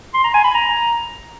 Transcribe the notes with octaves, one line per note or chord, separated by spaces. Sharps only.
C6
A#5
G#5
B5
A#5